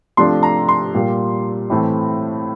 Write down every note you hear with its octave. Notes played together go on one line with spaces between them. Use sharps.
C3 F3 A3 D4 C6
A#5
C6
A#2 G3 A#3
A2 E3 A3 C4